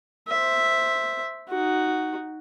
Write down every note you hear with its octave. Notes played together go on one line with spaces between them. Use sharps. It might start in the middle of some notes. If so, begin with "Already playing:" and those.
C5 E5
D#4 F#4